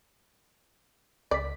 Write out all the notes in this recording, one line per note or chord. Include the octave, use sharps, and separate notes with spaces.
C#2 D5 B6